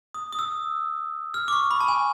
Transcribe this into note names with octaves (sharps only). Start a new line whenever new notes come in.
D#6
D#6
E6
F6
D6
C#6
B5
A5
G#5